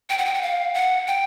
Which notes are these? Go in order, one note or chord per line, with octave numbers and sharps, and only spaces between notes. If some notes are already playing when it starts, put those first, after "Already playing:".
G5
F#5
G5
F#5
F5
F#5
G5